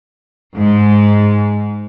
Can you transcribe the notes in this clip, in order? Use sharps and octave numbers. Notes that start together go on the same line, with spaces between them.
G#2